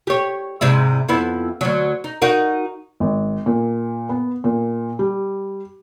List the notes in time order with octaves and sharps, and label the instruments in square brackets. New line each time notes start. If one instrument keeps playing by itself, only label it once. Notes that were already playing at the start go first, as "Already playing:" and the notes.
[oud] G4 C#5
G#2 C3 E4
F2 B3 E4
D2 F#3
D#4
D#4 F#4 A#4
[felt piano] G#1
A#2
B3
A#2
G3